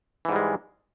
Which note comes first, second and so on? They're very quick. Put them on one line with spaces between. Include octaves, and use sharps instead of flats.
E3 G#2 G3 G#3